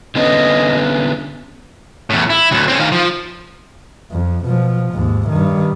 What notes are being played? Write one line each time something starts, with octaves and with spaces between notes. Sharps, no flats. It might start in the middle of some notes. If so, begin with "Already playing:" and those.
D3 B3 C#4 D#5
E2 A2
E4
D2 A2
C4 C#4
D#3 F5
F3
F2
B2 F3
D#2 G#2
G2 D#3